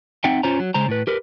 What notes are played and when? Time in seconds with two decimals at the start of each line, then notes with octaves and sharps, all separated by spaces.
0.24 C4 D#4 E5 F#5 G5
0.43 C#4 F4 C5 C#5 A#5
0.60 F#3
0.74 C#3 G#3 C5 A#5
0.88 A2 B4
1.07 G4 A#4 B4